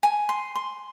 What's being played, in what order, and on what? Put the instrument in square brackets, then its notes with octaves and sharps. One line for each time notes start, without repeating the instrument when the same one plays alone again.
[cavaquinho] G#5
C6
C6